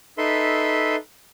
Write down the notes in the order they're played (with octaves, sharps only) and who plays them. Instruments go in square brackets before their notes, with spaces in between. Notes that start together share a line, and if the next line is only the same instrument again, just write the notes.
[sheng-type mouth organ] D#4 A4 B4 E5 C6